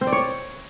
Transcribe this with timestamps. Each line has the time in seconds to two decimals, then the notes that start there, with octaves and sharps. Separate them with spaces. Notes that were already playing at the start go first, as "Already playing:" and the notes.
0.01 C4
0.07 D5
0.12 C#5